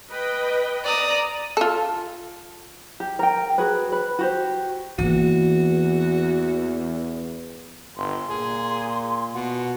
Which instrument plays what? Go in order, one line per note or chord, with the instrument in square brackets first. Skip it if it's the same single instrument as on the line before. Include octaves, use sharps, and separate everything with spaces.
[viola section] B4 D#5 G5
[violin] D5 D#6 [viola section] A#5
[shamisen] F4 A4
[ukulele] G4
A#4 G5
F#4 G#4 B4
B4
F#4 G4 C5
[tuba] E2 [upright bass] E3 A#3 [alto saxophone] F#4
[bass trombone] G1 [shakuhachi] C6
[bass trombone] A#2 [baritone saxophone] G#4
[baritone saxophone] B2 [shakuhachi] F#5